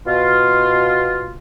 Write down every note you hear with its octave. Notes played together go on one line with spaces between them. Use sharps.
B2 F4